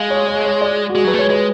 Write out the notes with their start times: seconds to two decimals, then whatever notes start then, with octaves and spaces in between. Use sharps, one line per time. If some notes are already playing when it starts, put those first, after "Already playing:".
Already playing: G#3 F5
0.10 C#5
0.28 C#5
0.45 C#5
0.61 D5
0.89 F#4
0.95 G#3 G#4
1.04 F#3 B4
1.13 A3
1.18 G#3 C#5
1.30 G#3 B4